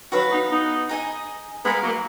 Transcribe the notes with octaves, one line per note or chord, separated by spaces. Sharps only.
D#3 F#3 F#4 B4 F5
B3 D#4
B3 D#4
D#4 G#4 D#5 G#5
G#3 B3 D#4 A#4 F5
F#3 A#3